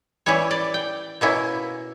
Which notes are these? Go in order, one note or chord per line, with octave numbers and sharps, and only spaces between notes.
E3 G3 C#4 E4 C#5
D5
G5
B2 A#3 C#4 E4